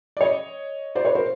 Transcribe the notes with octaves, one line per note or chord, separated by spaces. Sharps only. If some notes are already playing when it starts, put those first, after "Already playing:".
D5
C#5 D#5
C5 D5
B4 C#5
A#4 C5